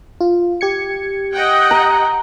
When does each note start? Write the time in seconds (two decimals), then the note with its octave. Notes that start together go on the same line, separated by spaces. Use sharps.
0.20 F4
0.61 G4 G#6 C#7
1.33 D#5 F#5 G5
1.71 A#5